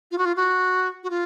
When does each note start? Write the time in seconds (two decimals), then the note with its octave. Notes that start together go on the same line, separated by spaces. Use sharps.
0.12 F4
0.18 F#4
0.25 F4
0.37 F#4
1.04 F#4
1.10 F4